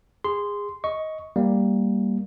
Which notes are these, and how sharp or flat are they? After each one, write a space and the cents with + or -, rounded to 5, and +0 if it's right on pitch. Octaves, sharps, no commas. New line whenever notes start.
G#4 -25 C6 -10
D#5 +15 C#6 +0
G3 +0 A#3 +0